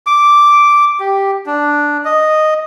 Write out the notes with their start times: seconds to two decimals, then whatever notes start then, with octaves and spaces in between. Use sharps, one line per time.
0.07 D6
1.00 G4
1.46 D4
2.05 D#5